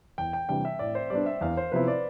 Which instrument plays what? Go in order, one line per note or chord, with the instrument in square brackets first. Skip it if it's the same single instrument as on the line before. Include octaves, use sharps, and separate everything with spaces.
[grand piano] E2 [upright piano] G5
[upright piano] G5
[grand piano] C3 E3 G3 D4 [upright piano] G5
[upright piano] E5
[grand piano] A2 [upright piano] D5
[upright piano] C5
[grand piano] G3 B3 D4 [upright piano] D5
[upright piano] E5
[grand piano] E2 [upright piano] F5
[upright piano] C5
[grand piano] C3 F3 B3 E4 [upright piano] B4
[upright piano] D5